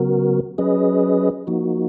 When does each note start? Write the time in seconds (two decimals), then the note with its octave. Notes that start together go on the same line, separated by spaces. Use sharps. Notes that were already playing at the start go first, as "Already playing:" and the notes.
Already playing: C#3 F#3 B3 F#4 A#4
0.58 F#3 C#4 G#4 B4 D#5
1.47 F3 A#3 D#4 F#4